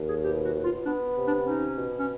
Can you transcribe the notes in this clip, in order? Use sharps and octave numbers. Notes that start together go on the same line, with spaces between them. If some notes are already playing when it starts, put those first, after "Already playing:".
Already playing: D#2
G#4
B2 G4
F#4
B2
F4
B3 D4
C3
D4
C#4 D#4
B2
C#4